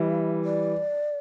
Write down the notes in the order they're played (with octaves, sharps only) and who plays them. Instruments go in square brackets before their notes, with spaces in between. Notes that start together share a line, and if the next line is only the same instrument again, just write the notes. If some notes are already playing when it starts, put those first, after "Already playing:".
Already playing: [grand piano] E3 G3 [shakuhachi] E5
[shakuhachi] D5